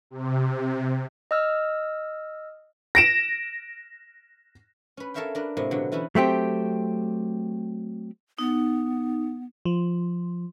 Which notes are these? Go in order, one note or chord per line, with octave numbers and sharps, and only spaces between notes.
C3
D#5 E6 F6
A#6 D7 E7
C#4 B4
A4 A#4 C#5 E5 F5 G5
D4 A#4 B4
A2 C3 G#3 A#3
B2 D3 F#3
E3 C#4 E4 B4
F#3 A3 C4 G4
B3 D#4
F3